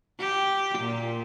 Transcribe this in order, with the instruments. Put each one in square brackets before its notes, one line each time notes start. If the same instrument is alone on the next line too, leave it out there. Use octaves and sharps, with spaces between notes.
[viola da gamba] G4
A#2